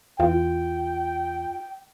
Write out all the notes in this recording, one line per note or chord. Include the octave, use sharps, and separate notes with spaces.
E2 F4 G5